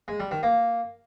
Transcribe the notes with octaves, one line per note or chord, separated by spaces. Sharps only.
G#3
G3
D#3
A#3